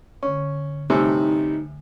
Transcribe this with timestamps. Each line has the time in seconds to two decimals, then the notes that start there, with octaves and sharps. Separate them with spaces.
0.23 D3 C#4 C#6
0.90 A2 C3 G3 D#4 G#5 E6